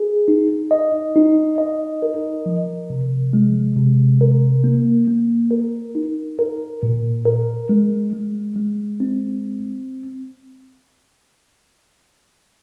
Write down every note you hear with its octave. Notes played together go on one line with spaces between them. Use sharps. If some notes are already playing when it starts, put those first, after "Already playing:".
Already playing: G#4
D#4
D#5
D#4
D#5
A#4
F3
C3
G#3
C3
A#4
A#3
A#3
A#4
D#4
A#4
A#2
A#4
G#3
G#3
G#3
C4